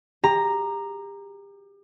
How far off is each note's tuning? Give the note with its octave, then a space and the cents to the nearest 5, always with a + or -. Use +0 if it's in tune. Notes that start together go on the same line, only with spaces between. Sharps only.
G4 +35 A#5 +0